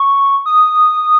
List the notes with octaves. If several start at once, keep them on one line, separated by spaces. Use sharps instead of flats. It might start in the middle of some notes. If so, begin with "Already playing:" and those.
Already playing: C#6
D#6